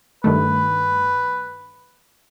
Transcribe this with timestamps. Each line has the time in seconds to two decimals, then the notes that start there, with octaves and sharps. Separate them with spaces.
0.24 G2 D#3 A3 B4